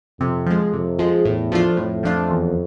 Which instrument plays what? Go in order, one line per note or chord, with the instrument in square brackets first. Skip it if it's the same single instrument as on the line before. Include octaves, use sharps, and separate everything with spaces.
[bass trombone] F2 [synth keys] C3
[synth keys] F3 G#3
[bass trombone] F2 [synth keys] C3
[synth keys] F3 G#3
[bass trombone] E2 [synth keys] A2
[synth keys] F3 A3 D4 F4
[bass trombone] F2 [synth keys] A2
[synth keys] F3 A3 D4 F4
E2